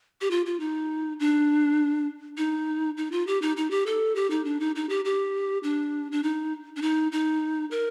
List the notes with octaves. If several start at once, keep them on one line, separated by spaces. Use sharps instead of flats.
G4
F4
F4
D#4
D4
D#4
D#4
F4
G4
D#4
D#4
G4
A4
G4
D#4
D4
D#4
D#4
G4
G4
D4
D4
D#4
D4
D#4
D#4
A#4